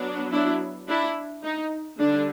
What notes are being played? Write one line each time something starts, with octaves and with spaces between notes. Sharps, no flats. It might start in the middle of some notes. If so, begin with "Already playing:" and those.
Already playing: F#3 B3 D4
D4 E4
D4 E4
D#4
D3 G3 D4